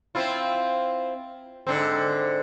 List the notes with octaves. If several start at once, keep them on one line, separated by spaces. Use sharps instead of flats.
C4 E4 F4
G#2 D3 C4